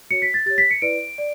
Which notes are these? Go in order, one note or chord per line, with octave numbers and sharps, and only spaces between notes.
F#4 C#5 C#7
B6
A6
G4 C#5 A6
B6
C#7
E4 B4 D5 D7
D5